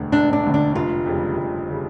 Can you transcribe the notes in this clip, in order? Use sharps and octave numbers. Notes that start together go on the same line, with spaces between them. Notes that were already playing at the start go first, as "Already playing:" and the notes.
Already playing: E1 D2 D3
E1 D4
D4
D2 D3
D4
F1 F4
F2 C#3 G3
F1
C#3 G3